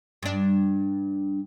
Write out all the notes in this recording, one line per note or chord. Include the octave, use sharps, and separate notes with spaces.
G2 D4